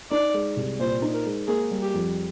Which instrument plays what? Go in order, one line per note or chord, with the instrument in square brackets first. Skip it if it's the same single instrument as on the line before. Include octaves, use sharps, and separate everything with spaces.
[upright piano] D#4 [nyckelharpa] D5
[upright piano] G#3
C2
[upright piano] A#2 [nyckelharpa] C5
[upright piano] D#4
[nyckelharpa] A#4
[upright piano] G#3
[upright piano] A#3 [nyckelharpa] G#4
[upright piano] G3
[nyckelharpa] G4
[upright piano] F2